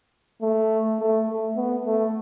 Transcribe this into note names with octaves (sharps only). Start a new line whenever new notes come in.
A3
A3
A3
B3
A3